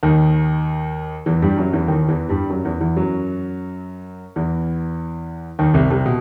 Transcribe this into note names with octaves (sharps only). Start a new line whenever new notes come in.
D#2 D#3
E2 E3
G2 G3
F#2 F#3
E2 E3
D#2 D#3
E2 E3
G2 G3
F#2 F#3
E2 E3
E2 E3
F#2 F#3
E2 E3
D#2 D#3
C2 C3
C2 C3
B2